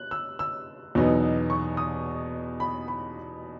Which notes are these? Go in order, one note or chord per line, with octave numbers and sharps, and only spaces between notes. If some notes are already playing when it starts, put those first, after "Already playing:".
Already playing: F#6
E6
E6
E2 B2 F#3 B3 D#4
C#6
D#6
B5
B5